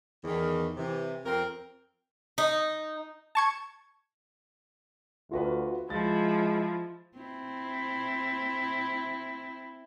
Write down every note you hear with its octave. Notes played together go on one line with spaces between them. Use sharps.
E2 D#3
C3 E3
F2 C4 A#4
D#4
A5 C#6 G#6
D2 F4 F#4 B4
F3 G#3 E4 A6
C4 E4